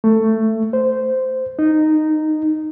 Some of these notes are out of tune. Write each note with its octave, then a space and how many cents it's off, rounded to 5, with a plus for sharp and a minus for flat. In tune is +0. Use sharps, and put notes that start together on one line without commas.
A3 +15
C5 -10
D#4 -10